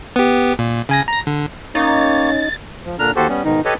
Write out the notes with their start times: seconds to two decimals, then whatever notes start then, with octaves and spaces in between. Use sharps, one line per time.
0.16 B3 G4
0.59 A#2
0.89 C#3 G#5 A#6
1.08 A#5 A#6
1.27 D3
1.75 A#3 C#4 D#4 C#5 A6
2.85 F3
2.99 A#2 D3 D4 A#5 F6
3.16 D#2 F#4 G4 A4 C5
3.29 G3 B3 C#4
3.45 G#2 B2 D#3 D#4
3.65 G4 A4 B4 C#5 D#5